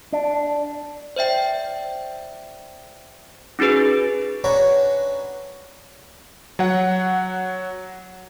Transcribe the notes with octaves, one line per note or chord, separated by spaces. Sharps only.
D4
C5 D5 E5 G5
C#4 D#4 F#4 G#4 B4
C#4 D4 F#4 B4 C#5 A#5
F#3 F#5